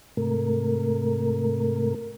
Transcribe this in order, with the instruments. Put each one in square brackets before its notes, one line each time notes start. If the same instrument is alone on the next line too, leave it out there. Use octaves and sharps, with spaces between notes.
[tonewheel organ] G#2 C3 A3 A#4